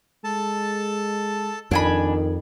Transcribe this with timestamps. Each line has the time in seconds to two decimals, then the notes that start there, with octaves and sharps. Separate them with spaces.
0.24 G#3 A4 A5
1.71 F2 D#3 D4 G#5 B5